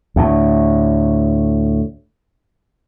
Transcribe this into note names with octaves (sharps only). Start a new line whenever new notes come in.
D2 A2